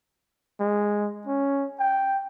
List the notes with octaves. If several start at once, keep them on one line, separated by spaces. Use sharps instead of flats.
G#3
C#4
G5